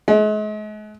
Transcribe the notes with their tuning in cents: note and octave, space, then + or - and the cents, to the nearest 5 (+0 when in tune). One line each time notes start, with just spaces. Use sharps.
G#3 +40